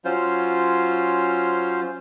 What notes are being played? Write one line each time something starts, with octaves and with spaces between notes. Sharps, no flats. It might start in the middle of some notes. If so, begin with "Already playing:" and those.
F#3 C#4 F4 C5